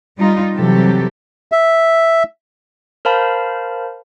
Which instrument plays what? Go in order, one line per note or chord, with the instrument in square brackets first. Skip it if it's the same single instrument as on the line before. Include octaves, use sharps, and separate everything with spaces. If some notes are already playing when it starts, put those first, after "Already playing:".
[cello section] G3 D#4 F4
C3 E3 F#3 G3 G4 A4
[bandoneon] E5
[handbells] A#4 C5 F5 A5 B5